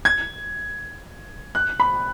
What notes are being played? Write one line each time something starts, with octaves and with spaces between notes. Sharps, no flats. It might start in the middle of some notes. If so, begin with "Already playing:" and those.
G#6
F#6
B5